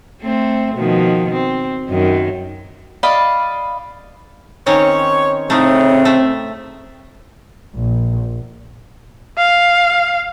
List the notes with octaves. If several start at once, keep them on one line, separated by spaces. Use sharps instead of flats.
A3 C4
B2 D#3 F3
C4
F#2 D#3
D5 D#5 F5 B5
D#3 C4 C#4 C#5
A2 C#3 A3 C4 D#4
A3 E5
A#1
F5